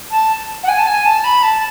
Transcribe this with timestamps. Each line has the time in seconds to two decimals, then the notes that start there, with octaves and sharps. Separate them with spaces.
0.11 A5
0.63 F#5
0.68 G#5
0.78 A5
0.87 G#5
1.05 A5
1.24 B5
1.43 A5